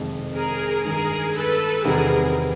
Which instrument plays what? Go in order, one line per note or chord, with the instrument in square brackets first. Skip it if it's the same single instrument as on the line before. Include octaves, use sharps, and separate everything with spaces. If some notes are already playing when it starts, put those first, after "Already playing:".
Already playing: [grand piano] F2 C3 D#3 G#3
[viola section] G#4 A#4
[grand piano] G2 D#3 G#3 [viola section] G#4 A#4
[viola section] A4 B4
[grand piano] E2 C3 D#3 G3 [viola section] G#4 A#4